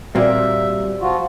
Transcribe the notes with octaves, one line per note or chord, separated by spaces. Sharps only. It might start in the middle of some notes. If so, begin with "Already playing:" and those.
A#2 G3 A#3 C4 F#4 G4 D5 E5
F3 F4 F#4